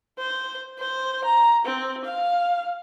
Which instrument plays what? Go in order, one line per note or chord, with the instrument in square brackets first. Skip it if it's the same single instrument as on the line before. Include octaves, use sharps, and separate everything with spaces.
[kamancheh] C5
C5
A#5
C4
F5